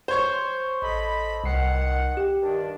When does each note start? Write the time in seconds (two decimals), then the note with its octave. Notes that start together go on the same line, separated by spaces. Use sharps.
0.08 C5 C#5 C#6
0.82 A1 A4 D#5 B5
1.44 C2 D#3 F#5 C7
2.17 G4 G5
2.42 G2 D#3 D4